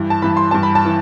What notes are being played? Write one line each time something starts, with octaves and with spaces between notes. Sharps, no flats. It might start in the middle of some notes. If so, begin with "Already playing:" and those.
Already playing: G2 E3 B5
A5
G2 E3 B5
C6
G2 E3 A5
B5
A5
E3